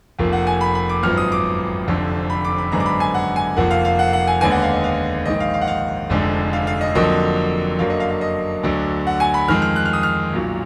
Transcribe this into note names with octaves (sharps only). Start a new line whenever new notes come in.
F1 F2 F3 A#3
F#5
G#5
B5
B5
D6
G#1 F#2 F3 B3 F6
D#6
D6
F1 F2 D3
B5
D6
B5
G#1 F#2 D3 G#3 B3 A#5
D6
B5
G#5
F#5
G#5
F1 F2 F3 A#3 F#5
F5
F5
F#5
F#5
G#5
D#2 D3 G#3 B3 G#5
F#5
F5
D#5
F5
A#1 G#2 D#3 D#5
F5
F5
F#5
F5
F1 F2 D3 G#3
F5
F5
D#5
F2 D3 F#3 A#3 D#5
F#2 D3 F#3 A#3 F5
D#5
F5
F5
D#5
D2 D3 F#3
F#5
G#5
B5
F2 D#3 G#3 F6
F6
F#6
F6
D#6
F6
B1 A#2 F#3